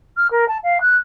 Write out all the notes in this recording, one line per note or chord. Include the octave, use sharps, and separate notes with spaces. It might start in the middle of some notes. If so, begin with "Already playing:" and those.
F6
A#4
A5
F5
F#6